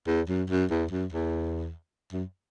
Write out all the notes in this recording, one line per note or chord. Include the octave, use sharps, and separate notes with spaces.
E2
F#2
F#2
E2
F#2
E2
F#2